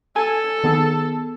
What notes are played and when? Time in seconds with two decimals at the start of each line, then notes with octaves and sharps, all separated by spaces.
0.16 A4 G#5
0.64 D#3 B3 G#4